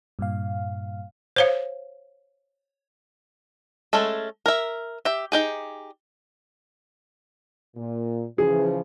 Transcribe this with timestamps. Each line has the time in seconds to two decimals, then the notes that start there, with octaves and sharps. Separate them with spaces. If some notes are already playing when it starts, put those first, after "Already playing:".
0.19 G2 A#2 F5
1.36 C5 C#5 F5
3.93 G#3 A3 C#4 A4
4.46 A#4 E5
5.05 G4 E5
5.32 D#4 G4 G#4
7.77 A#2
8.38 C#3 E3 F3 G#4